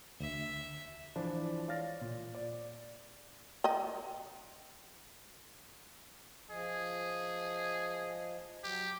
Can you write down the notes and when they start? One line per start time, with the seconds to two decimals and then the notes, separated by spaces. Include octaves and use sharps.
0.20 D2 E5
1.16 E3 F3 D4 D5
1.68 C#5 D5 F5 F6 A6 A#6
2.01 A#2
2.35 D5
3.64 D#5 G5
6.50 F3 G#4 D#5
8.64 F#3 G4